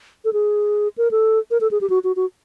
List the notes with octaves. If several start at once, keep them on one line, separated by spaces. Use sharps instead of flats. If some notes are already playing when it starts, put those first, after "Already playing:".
A4
G#4
A#4
A4
A#4
A4
G#4
G4
F#4
F#4
F#4